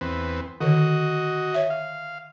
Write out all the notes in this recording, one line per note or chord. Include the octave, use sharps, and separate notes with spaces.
E2 C4 B4
D3 D#3 F#4 C#5 D#5
C#5 E5
F5